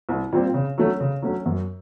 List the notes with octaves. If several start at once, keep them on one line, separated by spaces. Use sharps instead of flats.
C2
A#2 G3 C4
C#3
F#3 A3 C#4
C#3
F#3 A3 C#4
F#2